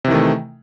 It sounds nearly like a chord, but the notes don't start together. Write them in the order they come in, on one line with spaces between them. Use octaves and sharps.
C3 E3 D#3 A3